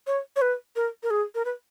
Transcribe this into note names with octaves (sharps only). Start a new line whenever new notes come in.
C#5
C#5
B4
A#4
A#4
G#4
A#4
B4